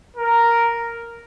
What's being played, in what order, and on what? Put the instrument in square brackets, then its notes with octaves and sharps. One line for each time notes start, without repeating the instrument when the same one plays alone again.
[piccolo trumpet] A#4